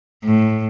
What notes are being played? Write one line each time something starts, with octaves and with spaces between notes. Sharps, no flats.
A2